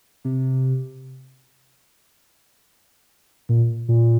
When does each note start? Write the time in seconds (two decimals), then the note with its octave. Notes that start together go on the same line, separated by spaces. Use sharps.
0.25 C3
3.49 A#2
3.88 A#2